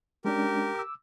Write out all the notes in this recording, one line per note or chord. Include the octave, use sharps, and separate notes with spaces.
G#3 C#4 D4 G4 A#4
D6 E6